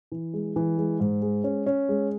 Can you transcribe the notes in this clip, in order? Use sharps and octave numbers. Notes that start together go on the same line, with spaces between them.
E3
G#3
E3
G#3
G#2
G#3
C#4
C#4
G#3